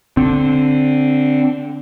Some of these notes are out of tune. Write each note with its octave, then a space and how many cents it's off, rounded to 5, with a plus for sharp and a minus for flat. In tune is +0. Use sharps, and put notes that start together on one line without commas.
D3 -10 C4 +0